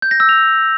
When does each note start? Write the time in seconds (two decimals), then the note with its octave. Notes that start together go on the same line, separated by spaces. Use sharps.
0.02 G6
0.11 A#6
0.20 E6
0.29 F7